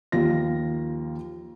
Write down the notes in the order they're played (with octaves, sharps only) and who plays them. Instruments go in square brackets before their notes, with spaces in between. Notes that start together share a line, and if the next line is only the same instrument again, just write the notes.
[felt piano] D#2 F3 F4 A#6